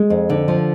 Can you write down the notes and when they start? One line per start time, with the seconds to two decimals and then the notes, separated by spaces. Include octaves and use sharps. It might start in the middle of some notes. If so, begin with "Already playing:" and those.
Already playing: G#3
0.10 F2
0.30 D3
0.48 F3